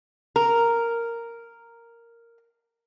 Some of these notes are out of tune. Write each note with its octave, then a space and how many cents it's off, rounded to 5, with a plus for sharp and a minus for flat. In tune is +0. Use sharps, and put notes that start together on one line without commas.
A#4 -5